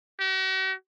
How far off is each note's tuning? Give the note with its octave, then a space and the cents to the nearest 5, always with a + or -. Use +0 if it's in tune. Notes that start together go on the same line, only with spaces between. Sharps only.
F#4 +45